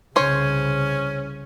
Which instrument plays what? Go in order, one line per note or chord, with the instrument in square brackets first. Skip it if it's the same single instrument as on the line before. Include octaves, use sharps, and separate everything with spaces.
[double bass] C2 C#3 [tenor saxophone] C#4 [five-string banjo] C5 C#5